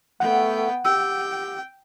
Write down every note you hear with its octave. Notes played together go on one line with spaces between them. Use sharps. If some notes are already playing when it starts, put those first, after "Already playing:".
A3 B3 F#5 G5
G4 G5 E6